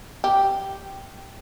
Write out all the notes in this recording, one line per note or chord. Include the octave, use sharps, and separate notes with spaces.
G4